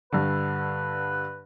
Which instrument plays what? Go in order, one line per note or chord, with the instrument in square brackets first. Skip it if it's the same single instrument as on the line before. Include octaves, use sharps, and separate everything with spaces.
[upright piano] G2 D3 [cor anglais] B4